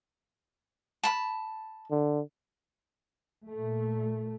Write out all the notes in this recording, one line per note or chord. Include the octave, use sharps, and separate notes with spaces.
A5 B5
D3
A#2 A3